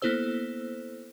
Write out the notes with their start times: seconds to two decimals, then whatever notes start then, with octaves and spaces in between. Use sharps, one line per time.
0.02 A#3 B3 E4 A4 C5 E6